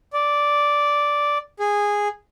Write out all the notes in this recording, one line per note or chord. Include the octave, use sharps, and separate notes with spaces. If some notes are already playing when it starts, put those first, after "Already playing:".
D5
G#4